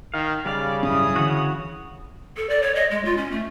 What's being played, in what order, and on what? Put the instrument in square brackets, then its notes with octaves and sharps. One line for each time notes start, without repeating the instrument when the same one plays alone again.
[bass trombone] D#3 [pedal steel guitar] F5
[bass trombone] C#3 [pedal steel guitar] G3 F5 [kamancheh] D5
[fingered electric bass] G#1 F#2 C#4 [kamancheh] E4 D#6
[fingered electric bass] D3 E3 [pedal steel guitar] F#4 C#5 F#5
[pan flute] A4
D5
C#5
D#5
G#3
F4
C#4
A3